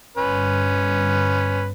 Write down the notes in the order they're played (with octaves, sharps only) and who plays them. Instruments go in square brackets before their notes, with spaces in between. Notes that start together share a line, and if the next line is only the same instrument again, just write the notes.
[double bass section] G1 [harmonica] C#4 B4